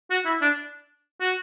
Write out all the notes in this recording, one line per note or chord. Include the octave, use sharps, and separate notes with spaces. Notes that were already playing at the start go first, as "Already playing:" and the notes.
F#4
E4
D4
F#4